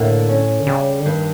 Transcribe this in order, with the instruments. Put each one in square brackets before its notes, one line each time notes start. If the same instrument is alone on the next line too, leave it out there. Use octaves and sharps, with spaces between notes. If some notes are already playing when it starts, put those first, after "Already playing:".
Already playing: [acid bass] A2 [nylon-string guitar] D3 A#3
[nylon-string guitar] C#4
[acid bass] D3
[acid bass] C#3 [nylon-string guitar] G3
[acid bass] D3
[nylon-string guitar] G2 [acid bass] D#3